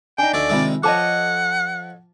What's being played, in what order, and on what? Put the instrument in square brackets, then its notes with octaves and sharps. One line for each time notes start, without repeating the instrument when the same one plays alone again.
[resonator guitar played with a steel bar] D4 D#4 [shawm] G5 [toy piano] G#5
[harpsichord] D2 C#5 E5 [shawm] D5
[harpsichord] C3 D#3 G#3 [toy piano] F4 E5 E6
[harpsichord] F3 [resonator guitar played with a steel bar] A4 C#5 D#5 [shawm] F#5 [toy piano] A5 D6